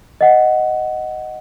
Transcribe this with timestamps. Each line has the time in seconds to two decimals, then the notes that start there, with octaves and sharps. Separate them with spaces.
0.21 D#5 F#5